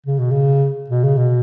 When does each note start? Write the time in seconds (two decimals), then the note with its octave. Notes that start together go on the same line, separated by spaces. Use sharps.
0.06 C#3
0.19 B2
0.31 C#3
0.90 B2
1.04 C#3
1.18 B2